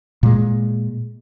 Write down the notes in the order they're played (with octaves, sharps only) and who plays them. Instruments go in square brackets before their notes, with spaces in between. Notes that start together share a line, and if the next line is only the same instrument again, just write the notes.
[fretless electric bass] A#2 G#3